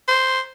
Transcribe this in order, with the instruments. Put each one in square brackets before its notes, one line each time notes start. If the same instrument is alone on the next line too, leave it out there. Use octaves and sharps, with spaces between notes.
[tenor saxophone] C5